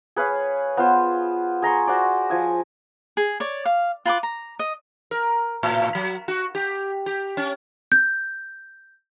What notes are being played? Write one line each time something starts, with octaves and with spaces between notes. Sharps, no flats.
G#4 B4 C#5 F5
B3 F4 C5
G#4 A#5 C6 C#6
F#4 C5 D5
F3 G#5 D#6
G#4
C#5 D5
F5
F4 B4 G5 D6
A#5
D#5
A#4
A2
F#3
F#4
G4
G4
C#4
G6